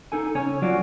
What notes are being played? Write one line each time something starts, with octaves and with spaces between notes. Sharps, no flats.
D#4 A4 G#5
C#3 C#4 C#5 G#5
F#3 F4 F#4 D5